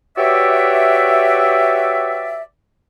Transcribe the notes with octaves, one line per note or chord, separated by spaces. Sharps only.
F#4 G4 B4 C#5 D5 E5